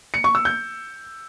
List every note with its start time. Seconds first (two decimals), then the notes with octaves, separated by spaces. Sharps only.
0.14 C#7
0.24 C#6
0.35 E6
0.45 G6